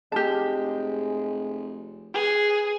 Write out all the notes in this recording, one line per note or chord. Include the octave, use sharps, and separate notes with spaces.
F1 G#3 G4 A5
G#4 B4